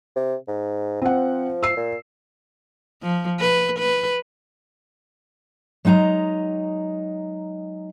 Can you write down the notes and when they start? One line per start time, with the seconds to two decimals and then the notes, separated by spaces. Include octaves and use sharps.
0.16 C3
0.48 G#2
1.02 F3 C4 F#5
1.63 E6 C7
1.76 A#2
3.03 F3
3.40 B4
3.79 B4
5.85 F#3 G#3 D#4 G#5 A#5